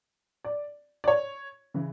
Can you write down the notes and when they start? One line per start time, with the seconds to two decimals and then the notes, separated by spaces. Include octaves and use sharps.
0.44 D5
1.04 D5
1.08 C#5
1.74 C#3 E3